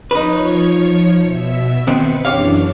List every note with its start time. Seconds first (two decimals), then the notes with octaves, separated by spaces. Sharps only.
0.11 F3 D#4 B4 C#5 C#6
1.22 B2 E5
1.87 D#3 B3 C4 B4 C#7
2.25 F#2 E3 D4 G4 C#5 F5